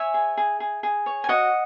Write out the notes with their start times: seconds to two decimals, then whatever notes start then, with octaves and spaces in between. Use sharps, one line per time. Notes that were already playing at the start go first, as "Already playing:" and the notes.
Already playing: C#5 E5 G#5
0.14 G#4
0.37 G#4
0.60 G#4
0.83 G#4
1.06 C#5
1.24 G#5
1.29 F#4 D#5 F#5